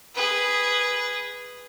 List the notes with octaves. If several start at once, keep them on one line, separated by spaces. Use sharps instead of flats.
G#4 B4